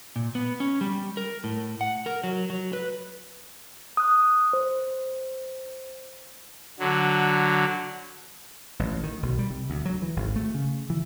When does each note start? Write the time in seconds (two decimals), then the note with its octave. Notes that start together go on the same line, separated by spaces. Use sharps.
0.16 A#2
0.35 B3
0.60 C#4
0.81 G3
1.17 A#4
1.44 A2
1.81 F#5
2.06 A#4
2.24 F#3
2.50 F#3
2.73 B4
3.97 D#6 F#6
4.53 C5
6.79 D3 F#3
8.79 A1
9.03 D#3
9.23 B1
9.39 G3
9.50 C3
9.70 D2
9.85 F#3
10.02 E3
10.16 G#1
10.36 A3
10.54 C#3
10.90 E3